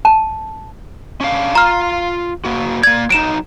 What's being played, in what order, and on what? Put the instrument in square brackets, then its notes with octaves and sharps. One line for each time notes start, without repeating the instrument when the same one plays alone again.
[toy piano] A5
[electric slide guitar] C#4 D4 F5
[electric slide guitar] F4 F5 [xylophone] A#5 F6
[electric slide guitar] F#3 A#3 F#4
[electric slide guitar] A#3 D5 [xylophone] G#6
[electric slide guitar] F#3 D#4 [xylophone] D7 E7